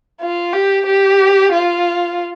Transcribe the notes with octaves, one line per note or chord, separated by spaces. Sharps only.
F4
G4
G4
F4